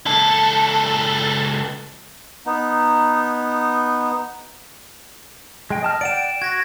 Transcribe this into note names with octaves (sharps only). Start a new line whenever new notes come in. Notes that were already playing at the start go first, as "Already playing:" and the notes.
C#2 A4
B3 D#4
G#3 G5
D#5 A5 F6
D5 F#5 G5 D7 E7
F#4 G#6 A#6